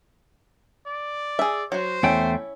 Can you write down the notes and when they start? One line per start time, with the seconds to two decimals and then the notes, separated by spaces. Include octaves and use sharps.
0.86 D5
1.39 G#4 E5
1.72 F#3 F#4 C5
2.03 E2 A3 C#4 E4 G5